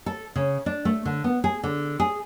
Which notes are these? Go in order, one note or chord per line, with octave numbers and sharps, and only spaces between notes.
A4
C#3
D4
A3
D3
B3
G#4
D3
G#4